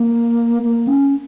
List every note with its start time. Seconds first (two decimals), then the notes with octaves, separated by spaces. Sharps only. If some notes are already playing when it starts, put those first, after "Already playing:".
Already playing: A#3
0.63 A#3
0.87 C#4